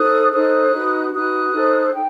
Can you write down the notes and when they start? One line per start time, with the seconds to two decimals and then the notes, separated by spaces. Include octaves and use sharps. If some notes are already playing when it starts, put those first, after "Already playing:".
Already playing: D#4 A4 C5 D#6 F#6
0.32 D#4 A4 C5 D#6 F#6
0.73 D#4 F#4 B4
1.13 D#4 F#4 B4 D#6 F#6
1.53 D#4 A4 C5
1.94 D#4 G5